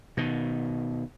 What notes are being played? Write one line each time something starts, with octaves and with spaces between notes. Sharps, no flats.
B2 D#3